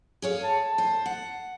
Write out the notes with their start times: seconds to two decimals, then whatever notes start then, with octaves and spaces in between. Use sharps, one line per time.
0.22 G#4 C#5 F5
0.43 A5
0.78 C5
1.06 F#5